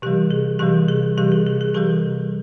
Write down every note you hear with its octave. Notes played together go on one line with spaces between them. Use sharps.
C3 E3 G3 G4
G#4
C3 E3 G3 G4
G#4
C3 E3 G3 G4
G#4
G#4
G#4
C3 E3 G3 G4 A4